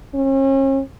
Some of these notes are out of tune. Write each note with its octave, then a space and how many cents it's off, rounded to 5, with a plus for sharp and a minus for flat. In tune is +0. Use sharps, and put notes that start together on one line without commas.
C#4 -40